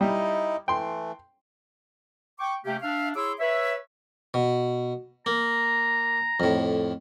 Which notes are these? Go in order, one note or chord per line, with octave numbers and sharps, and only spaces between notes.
G3 D#4 E4 D#5
E3 A3 G5 C6
G5 C#6 D6
C3 A3 A#3 C#4 G4
D4 E5 F5
E4 G#4 C#5 C6 D6 E6
B4 C#5 E5
B2
A#3 A#5
F2 A2